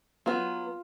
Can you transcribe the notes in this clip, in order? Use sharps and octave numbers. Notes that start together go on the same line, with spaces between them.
F#3 B3 F4